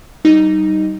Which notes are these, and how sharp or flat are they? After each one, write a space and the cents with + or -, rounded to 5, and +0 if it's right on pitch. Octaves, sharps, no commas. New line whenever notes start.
G3 -30 D#4 +0